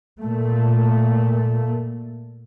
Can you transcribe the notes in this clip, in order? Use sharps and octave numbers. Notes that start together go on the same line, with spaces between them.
A#2 A3